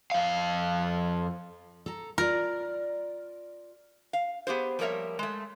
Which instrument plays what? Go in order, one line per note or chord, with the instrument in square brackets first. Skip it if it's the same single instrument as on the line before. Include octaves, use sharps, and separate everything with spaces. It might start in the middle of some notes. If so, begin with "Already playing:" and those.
[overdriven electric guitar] F2 F5
[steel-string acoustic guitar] A4 A#5
[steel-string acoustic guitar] F4 D5 [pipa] A#4
[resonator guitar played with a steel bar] F5
B3 G4 G#4 C5
F3 G3 A#3 A#4 C#5 E5
G#3 A3